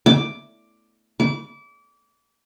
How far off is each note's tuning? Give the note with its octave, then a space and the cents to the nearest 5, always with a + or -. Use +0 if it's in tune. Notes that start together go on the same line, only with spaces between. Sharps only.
D6 +0
D6 -30